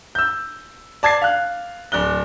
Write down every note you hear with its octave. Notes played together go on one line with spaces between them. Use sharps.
E6 G6
D5 A5 G#6 A6 C7
F5 F#6
D1 D5 F#6 G7